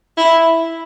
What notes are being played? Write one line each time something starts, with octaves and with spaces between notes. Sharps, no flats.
E4